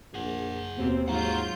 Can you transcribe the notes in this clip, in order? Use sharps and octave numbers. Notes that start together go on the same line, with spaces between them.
A#1 G#4 F#5
D#2 B2 C4
G#2 F#3 F4 F#5 A#5 G6